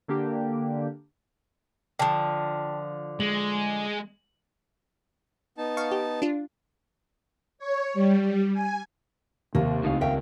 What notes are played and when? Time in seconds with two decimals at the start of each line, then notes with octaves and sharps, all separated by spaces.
0.08 D3 A#3 D4 G4
1.99 D3 F3 G5 A5
3.20 G#3 F#7
5.58 B3 D#4 A5
5.77 F5 C#6
5.91 G4
6.22 D4 F4
7.59 C#5
7.94 G3
8.53 G#5
9.55 D#2 C3 A#3
9.84 C#2 A2 C#3 C4 D#4 F5
10.01 A#4 E5 F5 G5